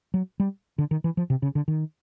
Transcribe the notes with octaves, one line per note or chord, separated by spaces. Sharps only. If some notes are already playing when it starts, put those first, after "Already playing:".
F#3
G3
D3
D#3
E3
F3
C3
C#3
D3
D#3